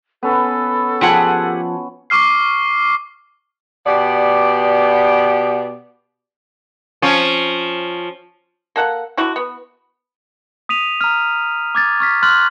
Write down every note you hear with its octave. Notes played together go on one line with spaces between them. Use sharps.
B3 C#4 A4 B4
F3 F4 G4 G#4 F#5 A5
C#6 D6 F6 C7
B2 B3 G4 D5
F3 C#4
A#3 A4 F#5
D3 E4 F#4
B3
D#6 B6 D#7 F7
A#5 F6
D6 G#6 A6
C#6 F6 B6
C6 F6 F#6 A6 F#7